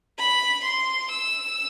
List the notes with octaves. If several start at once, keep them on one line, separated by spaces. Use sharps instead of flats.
B5
C6
E6